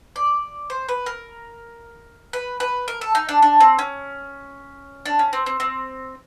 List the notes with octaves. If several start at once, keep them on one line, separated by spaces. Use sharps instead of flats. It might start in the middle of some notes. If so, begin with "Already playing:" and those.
D5
C5
B4
A#4
B4
B4
A#4
A4
D#4
D4
D4
C4
C#4
D4
C#4
C4
C4
C4